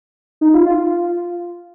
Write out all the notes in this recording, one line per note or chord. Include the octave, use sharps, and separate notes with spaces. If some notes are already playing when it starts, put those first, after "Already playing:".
D#4
F4
F4
F4